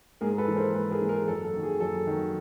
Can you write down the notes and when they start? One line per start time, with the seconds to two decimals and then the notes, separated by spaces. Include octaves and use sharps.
0.21 G#2 G#4 A#4
0.38 A4 B4
0.48 E3 G#3
0.56 A#4 C5
0.74 G#2 A4 B4
0.91 G#4 A#4
1.01 E3 G#3
1.09 G#4 A#4
1.27 F#2 A4
1.45 A4
1.53 D#3 F#3
1.63 G#4
1.80 F#2 A4
2.07 D#3 F#3